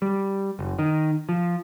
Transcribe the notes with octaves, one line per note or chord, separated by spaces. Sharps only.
G3
F#1
D#3
F3